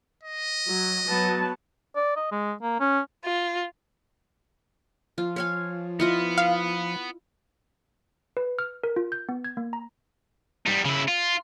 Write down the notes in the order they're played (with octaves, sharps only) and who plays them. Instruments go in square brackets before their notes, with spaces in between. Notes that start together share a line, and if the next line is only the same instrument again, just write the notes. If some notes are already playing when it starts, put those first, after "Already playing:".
[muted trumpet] D#5
[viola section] F#3
F#3 B3 A5
[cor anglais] D5
D#5
G#3
A#3
C#4
[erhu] F4
[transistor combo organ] F3 [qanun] F4
[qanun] C#5 F5 G#5
[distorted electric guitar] B3 [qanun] E4 F4 D#5
[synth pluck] F5
[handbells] B4
F6
A#4
F4
G6
B3
G#6
A#3
A#5
[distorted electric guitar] G3 D#4
C#3 E4
F4